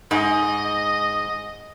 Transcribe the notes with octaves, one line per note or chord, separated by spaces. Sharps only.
G#2 D#5